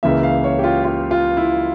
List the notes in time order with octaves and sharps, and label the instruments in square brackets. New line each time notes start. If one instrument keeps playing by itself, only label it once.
[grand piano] C#2 C#3 E3 A#3 E5
F5
C#5
G4
F4
F4
F4
E4